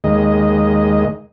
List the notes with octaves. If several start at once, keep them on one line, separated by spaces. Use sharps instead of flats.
D#2 G#3 D#5